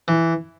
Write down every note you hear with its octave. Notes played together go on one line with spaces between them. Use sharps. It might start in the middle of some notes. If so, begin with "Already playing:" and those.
E3